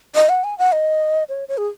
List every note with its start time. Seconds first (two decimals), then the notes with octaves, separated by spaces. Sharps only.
0.15 D#5
0.29 F#5
0.44 G#5
0.58 F#5
0.72 D#5
1.29 C#5
1.48 C#5
1.57 G#4